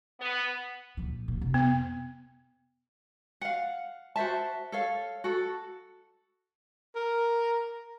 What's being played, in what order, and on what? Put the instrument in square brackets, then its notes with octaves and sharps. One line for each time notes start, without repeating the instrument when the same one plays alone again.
[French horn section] B3
[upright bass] A#2 F3
A#2
F2 C3
[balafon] B3
[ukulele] F5 F#5
F#4 C5 E5 A5
A4 C#5 F5
F#4 A4
[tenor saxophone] A#4